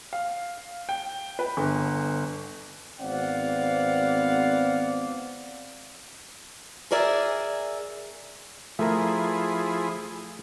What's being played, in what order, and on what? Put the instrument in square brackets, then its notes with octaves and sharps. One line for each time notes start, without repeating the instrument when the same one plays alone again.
[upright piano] F5
G5
B4
G1
[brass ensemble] G#1 B3 C4 D5 F5 F#5
[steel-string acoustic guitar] G#4 A#4 D5 E5 G#5
[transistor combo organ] F3 E4 G#4 [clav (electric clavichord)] A3 A#4